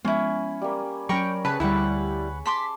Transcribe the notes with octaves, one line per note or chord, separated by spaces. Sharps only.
F3 G#3 B3 C#4 E4 F4
G3 A#3
F#3 C#4 A#4 C#5 G5 B5 C#6
C#3 G#4 B4 C#5 A5
D2 G3 E4 B4 F#5 B5 C#6
A5 C6 D6 B6